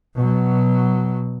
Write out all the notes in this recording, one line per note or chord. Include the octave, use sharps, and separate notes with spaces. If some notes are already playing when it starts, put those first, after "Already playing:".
B2 F#3